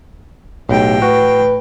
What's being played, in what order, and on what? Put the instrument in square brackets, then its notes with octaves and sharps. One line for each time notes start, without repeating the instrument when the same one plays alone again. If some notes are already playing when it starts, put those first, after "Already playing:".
[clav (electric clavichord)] B1 [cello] A2 G5 [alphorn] G4
[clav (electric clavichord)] F#4 [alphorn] B4